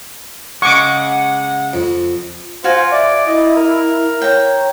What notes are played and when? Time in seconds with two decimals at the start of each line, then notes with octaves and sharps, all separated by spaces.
0.62 C#3 G#3 F#5 C#6 D6
1.73 F2
2.64 F4 F#4 C5 F5 G#5
2.92 D5 E5
3.27 E4 D#5
3.57 A#4
4.22 C#5 G5 A#5